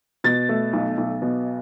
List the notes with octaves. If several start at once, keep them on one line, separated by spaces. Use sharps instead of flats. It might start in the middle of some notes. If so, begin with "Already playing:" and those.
B2 A6
A3
B1
B1
B2